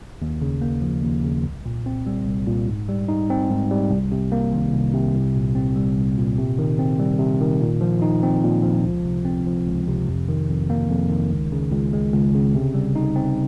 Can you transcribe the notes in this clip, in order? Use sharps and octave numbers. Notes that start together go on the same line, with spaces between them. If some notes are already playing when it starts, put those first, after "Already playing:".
D#2
C#3
A#3
F3
D#2
C#3
C2
A#2
C4
G3
C2
A#2
G#2
G3
D#4
C4
G#2
G3
C2
C3
A#3
D#3
C2
C3
C2
A#2
C4
G3
C2
A#2
C3
D#3
C4
G3
C3
D#3
A#2
F3
D#4
C4
A#2
F3
C#2
C3
C4
F3
C#2
C3
F2
D#3
F2
A#3
F2
D#3
C#2
C#3
C#2
G#3
C#2
C#3
C3
G3
D#4
C4